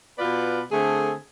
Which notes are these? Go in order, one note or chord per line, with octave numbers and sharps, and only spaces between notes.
B2 B3 F4 B4 D5
D3 A3 C4 G#4